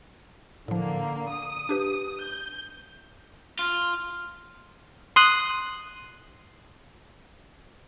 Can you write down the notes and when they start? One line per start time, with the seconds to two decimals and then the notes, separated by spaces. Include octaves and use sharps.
0.68 A2 D3 F3 A#3
1.31 D#6
1.69 D4 G4 B4
2.22 G6
3.59 F4
5.16 C6 D#6 F#6